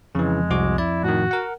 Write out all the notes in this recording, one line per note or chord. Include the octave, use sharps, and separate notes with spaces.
F2 C#3 E3 G#3
C2 F#4 D6
E4 D5
A2 D#3 F#4
A#4 F#5